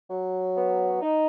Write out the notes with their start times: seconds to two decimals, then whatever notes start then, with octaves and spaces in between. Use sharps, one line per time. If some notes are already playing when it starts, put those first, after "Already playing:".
0.11 F#3
0.56 B3
1.02 D#4